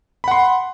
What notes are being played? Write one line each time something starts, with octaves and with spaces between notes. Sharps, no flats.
F#5 B5 C6